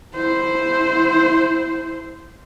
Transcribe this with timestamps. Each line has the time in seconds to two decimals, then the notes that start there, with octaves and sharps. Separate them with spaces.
0.16 E4 C5